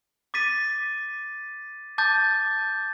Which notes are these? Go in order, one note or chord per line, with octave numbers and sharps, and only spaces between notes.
D6 A6 B6 D#7
A5 D6 G6 A6